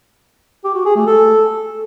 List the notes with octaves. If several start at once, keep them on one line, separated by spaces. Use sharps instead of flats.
G4
F#4
G#4
A3
A4